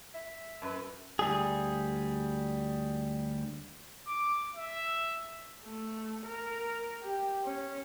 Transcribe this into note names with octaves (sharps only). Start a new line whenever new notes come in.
E5
F#2 B4
D2 G3 G#4
D6
E5
A3
A#4
G4
C#4